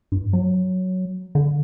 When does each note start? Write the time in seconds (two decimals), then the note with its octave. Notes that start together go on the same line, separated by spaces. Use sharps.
0.12 G2
0.33 F#3
1.35 D3